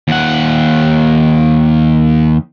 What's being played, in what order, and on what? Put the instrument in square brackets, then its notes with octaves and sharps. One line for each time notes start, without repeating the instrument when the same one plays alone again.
[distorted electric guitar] D#2 F#5